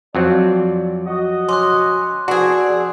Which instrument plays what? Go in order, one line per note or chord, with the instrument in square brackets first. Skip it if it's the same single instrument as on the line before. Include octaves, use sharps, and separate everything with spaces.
[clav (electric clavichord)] F2 F#3 C4 [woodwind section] D5
[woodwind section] F#4 D#5
[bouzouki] C#4 [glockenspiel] C6 D6 F#6
[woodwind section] E2 F3 C4 [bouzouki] D4 G#4 [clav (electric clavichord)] F#4